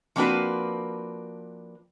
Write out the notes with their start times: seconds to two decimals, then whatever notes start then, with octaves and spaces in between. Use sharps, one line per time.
0.16 F3 A#3 C4 D4 F#4 B4